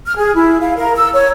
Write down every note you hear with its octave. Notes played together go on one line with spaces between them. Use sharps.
F6
G#4
E4
F5
A#4
E6
C#5